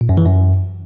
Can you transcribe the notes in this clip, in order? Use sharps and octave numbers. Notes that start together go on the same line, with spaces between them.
A#2
F#2
E3
F#2